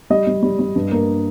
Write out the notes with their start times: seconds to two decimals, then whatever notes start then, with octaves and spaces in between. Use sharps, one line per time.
0.10 G3 D#5
0.27 G3
0.43 G3
0.59 G3
0.76 G2
0.91 A#3